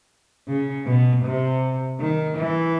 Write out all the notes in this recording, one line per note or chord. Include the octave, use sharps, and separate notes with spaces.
C#3
B2
C3
D#3
E3